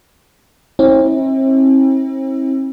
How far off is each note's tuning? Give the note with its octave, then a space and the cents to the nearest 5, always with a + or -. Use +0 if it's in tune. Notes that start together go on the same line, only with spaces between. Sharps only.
C4 +40 E4 -35